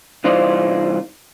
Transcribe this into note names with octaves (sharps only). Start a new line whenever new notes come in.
C2 E3 D#4 F4 C5 D5